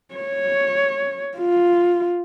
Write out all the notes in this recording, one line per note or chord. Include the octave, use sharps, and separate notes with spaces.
C#5
F4